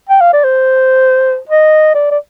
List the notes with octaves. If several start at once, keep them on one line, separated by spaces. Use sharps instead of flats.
G5
F5
D5
C5
D#5
D5
D5